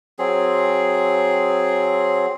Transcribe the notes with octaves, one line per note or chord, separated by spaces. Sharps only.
F#3 C4 G#4